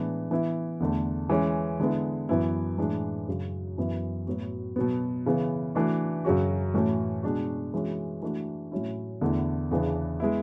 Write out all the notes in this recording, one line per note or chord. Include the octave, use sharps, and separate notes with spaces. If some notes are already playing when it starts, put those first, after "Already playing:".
Already playing: A2 E3 G#3 B3 D4
E3 B3 E4
E2 D3 A3
E3 G#3 C#4
D3 G#3 B3 E4
F#2 E3 B3 E4
A2 E3 G#3 D4
F#2 C#3 F#3
F#2 E3 B3 E4
A2 F#3 B3 F#4
B2 F#3 B3
C#3 E3 B3
E3 A3 D4 F#4
F#2 C#3 F#3 C#4 F#4
A2 E3 A3 C#4 F#4
B2 G#3 D4 F#4
E3 G#3 C#4 F#4
E3 A3 D4 F#4
A2 F#3 C#4 E4
E2 D3 A3 E4
E2 C#3 E3 B3 D4
G#3 B3 E4